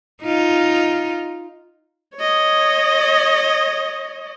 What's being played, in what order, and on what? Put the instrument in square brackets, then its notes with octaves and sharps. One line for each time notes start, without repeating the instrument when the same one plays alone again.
[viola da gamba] D#4 F4
[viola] C#5 D#5